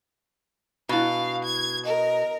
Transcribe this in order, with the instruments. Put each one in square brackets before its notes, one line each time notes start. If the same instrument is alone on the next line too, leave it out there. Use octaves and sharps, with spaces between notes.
[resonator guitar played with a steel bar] B2 [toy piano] D4 E4 [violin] F5
[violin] G#6
[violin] A#4 [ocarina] D#5